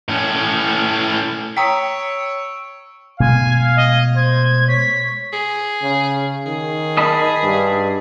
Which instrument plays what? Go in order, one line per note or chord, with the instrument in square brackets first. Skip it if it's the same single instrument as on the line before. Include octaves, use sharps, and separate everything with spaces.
[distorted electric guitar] A2 C#4
[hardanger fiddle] C#5 [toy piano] G5 D#6 [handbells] A#5 B6 [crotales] C#6 E6 D7
[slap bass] B2 G#3 A3 [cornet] F5 [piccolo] G#5
[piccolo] D#5
[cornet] C5 [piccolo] G#6
[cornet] C#5 [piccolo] B6
[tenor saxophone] G#4
[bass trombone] C#3
[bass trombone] D#3 [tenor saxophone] G#4
[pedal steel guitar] D#5 A5 B5
[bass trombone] G2